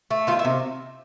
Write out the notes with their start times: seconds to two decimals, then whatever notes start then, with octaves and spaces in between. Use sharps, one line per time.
0.11 A3
0.27 D#3 F4
0.39 E4
0.45 C3